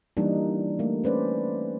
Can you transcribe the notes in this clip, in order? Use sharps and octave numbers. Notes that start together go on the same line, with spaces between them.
E3 G3 A#3 D4 D#4
A3 A#3
C#4 B4 C5 D5